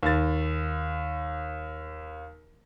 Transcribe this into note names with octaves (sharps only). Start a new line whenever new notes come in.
D#2 A6